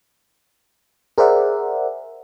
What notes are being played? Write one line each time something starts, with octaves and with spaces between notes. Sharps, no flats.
G#4 A#4 C5 D5 E5 F#5